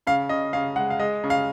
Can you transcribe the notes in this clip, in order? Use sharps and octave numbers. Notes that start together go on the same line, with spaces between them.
C#3 F5
C#3 D#5
C#3 F5
G#3 F#5
F5
G#3 D#5
C#3
F5